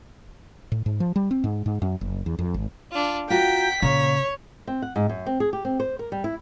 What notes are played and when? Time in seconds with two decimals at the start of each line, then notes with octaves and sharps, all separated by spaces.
0.72 A2
0.86 G#2
1.00 F3
1.16 G3
1.31 C4
1.44 G#2
1.66 G#2
1.82 F#2
2.01 F#1
2.26 E2
2.39 F2
2.54 G#1
2.91 D4 F4
3.30 F4 F#4 A#4 G5 B6
3.82 A#2 C#3 C#5
4.67 C4
4.82 F#5
4.96 G#2
5.09 F#2
5.26 C4
5.40 G#4
5.53 G4
5.65 C4
5.80 C5
5.99 A#4
6.12 G3
6.24 E4